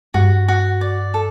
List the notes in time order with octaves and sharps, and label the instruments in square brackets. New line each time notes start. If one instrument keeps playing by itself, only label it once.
[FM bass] G2 [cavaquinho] F#4
[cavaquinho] F#4
D5
A4